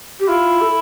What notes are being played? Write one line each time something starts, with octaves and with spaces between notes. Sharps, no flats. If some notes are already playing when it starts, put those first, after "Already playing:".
G4
E4 F4
A4